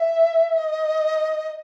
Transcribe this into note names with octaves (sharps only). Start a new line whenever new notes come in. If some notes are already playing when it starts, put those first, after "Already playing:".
Already playing: E5
D#5